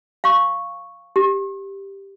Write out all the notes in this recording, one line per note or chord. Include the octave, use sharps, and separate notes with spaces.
F5 C#6
G4